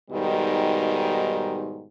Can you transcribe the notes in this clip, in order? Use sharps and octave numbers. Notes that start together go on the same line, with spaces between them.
G#2 B2 D#3 G3